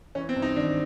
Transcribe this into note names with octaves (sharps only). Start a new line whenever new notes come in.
E3 C#4
C4
G2
D#4
G#1 D4